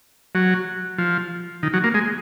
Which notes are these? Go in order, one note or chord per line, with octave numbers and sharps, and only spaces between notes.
F#3
F3
D#3
F#3
A#3
G#3